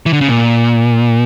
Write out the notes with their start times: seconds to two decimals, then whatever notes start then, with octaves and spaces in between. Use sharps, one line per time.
0.06 E3
0.13 D3
0.21 C#3
0.28 A#2